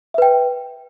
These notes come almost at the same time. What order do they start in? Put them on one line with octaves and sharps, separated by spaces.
E5 B4 G5